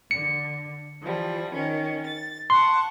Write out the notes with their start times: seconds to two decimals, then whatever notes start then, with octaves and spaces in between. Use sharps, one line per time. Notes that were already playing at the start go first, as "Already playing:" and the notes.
0.11 D3 C#7
1.02 E3 F3 G3
1.50 D#3 C#4
2.03 A6
2.50 F#5 A5 C6 C#6